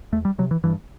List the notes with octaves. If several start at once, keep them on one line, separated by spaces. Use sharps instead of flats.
E2 A3
G3
C3 F#3
E3
G2 E3